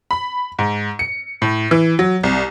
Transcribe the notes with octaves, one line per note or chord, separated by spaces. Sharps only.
B5
G#2
C#7
A2
E3
F#3
C2